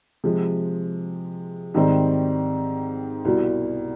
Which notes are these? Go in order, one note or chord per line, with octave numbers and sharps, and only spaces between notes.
C3 F3 G#3
G#2 D#3 G3 C4 D#4
C2 B2 G3